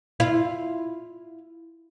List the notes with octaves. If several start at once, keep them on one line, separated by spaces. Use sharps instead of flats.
E4 F4